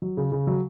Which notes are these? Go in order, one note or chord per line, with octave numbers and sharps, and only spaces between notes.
F#3
C#3
C#3
F#3